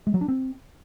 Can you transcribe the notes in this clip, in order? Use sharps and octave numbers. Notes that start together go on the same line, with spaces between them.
G#3
F#3
D4
C4